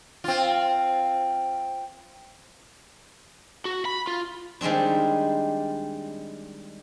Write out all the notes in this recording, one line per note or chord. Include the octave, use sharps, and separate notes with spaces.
C4 F4
F#4
B5
F4
D#3 G3 G#3 C4 D4